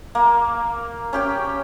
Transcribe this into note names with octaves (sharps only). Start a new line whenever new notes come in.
A#3
C#4 G4 G5